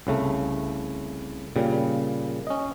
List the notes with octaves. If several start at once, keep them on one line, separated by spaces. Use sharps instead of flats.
C2 C#3 A3
A#2 C#3 G3
C#4 D#5